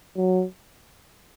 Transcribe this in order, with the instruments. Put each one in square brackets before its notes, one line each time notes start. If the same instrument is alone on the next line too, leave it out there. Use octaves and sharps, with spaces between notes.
[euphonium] F#3